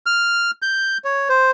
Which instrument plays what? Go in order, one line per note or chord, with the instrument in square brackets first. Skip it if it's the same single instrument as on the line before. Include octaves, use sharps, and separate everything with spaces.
[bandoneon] F6
G6
C#5
C5